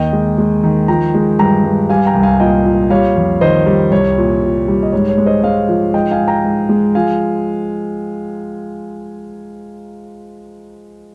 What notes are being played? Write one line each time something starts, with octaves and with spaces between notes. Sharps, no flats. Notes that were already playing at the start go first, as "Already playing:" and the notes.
Already playing: D#2 D#3 D#5 G5
G#3
G#3
D#3
F3 G5 A#5
G#3
G2 G5 A#5
G2
G3 F5 G#5
G5 A#5
C2
F5 G#5
A#2 D#5 G5
A#2
G3 C#5 F5
F2
D#3 C5 D#5
G3
C2 C#5
A#2
A#2
G3
D#5
G#2 C#5
C#5
G#3
C5 D#5
G#3 C#5 F5
F3
G#2 D#5 G5
F5 G#5
G#2
G5 A#5
G#2
G#3
F3 F5 G#5